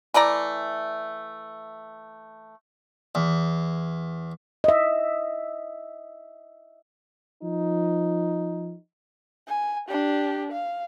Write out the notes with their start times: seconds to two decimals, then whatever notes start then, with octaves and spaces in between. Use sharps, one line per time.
0.14 E3 A3 D5 A#5
3.15 E2
4.64 D#5 E5
7.42 F3 D#4
9.48 G#5
9.89 D4 G4
10.52 F5